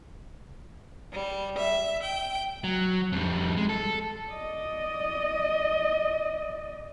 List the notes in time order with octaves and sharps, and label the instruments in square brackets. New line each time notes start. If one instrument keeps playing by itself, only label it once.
[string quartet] G3
E5
G5
[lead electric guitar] F#3
F2 G3
G#3
A4
[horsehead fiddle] D5 D#5